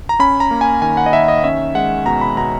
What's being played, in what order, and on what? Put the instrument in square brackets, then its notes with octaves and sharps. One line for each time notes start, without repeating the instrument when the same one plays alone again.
[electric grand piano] A#5
C#4 B5
A#5
A#3
G#5
D#3 G#5
F#5
D#5
D#3 E5
D#5
C#4 E5
G#3 F#5
B2 A#5
B5
B2 A#5